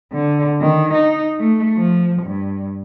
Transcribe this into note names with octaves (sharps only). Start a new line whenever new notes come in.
D3
D#3
D#4
A3
F3
G2